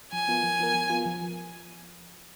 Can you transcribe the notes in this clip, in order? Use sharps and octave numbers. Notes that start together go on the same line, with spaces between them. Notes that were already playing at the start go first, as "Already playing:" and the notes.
F3 G#5
B3 F4 A#4
F3
B3 F4 A#4
F3
B3 F4 A#4
F3